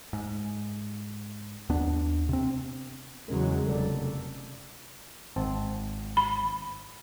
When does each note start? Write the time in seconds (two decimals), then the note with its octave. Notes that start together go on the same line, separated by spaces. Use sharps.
0.13 G#2
1.69 D#2 B3 D4
2.29 C3 C4
3.28 E2 C#3 F#3 G#3 C#4 A#4
3.67 F1 A4 D5
5.36 G#1 C4 A5
6.17 B5